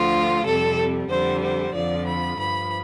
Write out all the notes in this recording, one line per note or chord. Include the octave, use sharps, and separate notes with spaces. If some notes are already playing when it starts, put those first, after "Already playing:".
Already playing: D2 D3 F3 F4
F2 C3 G3 A4
F2 D3 G3 C5
C5
F2 D3 F3 D5
B5
G2 F3 B5